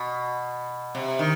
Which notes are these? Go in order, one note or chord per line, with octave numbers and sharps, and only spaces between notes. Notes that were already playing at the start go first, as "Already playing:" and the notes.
Already playing: B2
C3
D#3